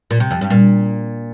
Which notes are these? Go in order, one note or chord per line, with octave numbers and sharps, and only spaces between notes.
A#2
C3
F2
G2
A#2